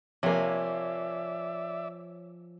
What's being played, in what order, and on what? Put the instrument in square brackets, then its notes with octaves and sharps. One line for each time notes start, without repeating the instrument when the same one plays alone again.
[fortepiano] C3 A#3 [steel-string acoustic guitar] F3 G#5 [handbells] C#5 [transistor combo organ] D5 E5